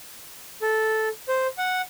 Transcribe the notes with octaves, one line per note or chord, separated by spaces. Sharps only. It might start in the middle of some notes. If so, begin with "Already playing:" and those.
A4
C5
F#5